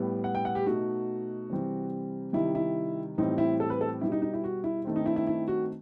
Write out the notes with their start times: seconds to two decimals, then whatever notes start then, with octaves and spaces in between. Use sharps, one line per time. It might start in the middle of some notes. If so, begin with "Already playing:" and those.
Already playing: A2 G3 B3
0.24 F#5
0.35 G5
0.45 F#5
0.55 G4
0.66 B2 A3 D#4 F#4
1.50 C3 E3 G3 C4
2.33 C3 D#3 G3 E4
2.55 E4
3.18 A2 E3 G3 C4 D#4
3.38 E4
3.60 A4
3.70 B4
3.81 A4
4.01 B2 G3 D#4 E4
4.12 D#4
4.22 D#4
4.33 E4
4.44 F#4
4.64 E4
4.85 G2 D#3 A3 C4
4.96 D#4
5.06 E4
5.16 E4
5.27 E4
5.48 F#4